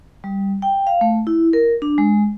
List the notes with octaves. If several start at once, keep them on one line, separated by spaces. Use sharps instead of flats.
G3
G5
F5
A3
E4
A#4
D4
G#3